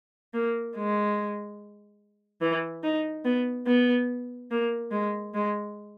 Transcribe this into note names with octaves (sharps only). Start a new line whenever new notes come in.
A#3
G#3
E3
D#4
B3
B3
A#3
G#3
G#3